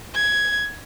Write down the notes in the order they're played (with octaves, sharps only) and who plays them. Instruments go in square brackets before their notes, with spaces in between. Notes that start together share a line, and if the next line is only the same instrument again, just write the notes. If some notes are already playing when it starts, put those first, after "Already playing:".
[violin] G#6